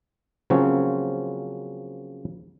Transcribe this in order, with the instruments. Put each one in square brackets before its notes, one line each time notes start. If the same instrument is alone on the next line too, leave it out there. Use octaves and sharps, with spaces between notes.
[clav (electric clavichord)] C#3 F3 F#3 A#3 C4 C#4